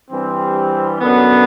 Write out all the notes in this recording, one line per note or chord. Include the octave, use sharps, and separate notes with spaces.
G2 E3 G3 C4
F#2 D3 F#3 B3